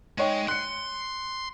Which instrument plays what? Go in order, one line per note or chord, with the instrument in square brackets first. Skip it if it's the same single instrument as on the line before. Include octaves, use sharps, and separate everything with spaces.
[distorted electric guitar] G#3 [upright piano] D#4 C#5 G5
[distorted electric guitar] C6 [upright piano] F#6 C#7